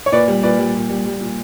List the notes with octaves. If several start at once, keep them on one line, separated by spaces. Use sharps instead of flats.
C#5
A#2 B4 D5
G3
A#2 B4 D5
G3
A#2
G3
G3
A#2